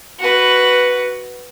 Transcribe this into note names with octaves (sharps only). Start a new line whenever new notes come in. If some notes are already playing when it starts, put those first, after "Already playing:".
F#4 B4